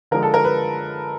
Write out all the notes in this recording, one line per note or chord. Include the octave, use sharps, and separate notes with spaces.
D3 F3 G#3 A#4
A4
A#4
B4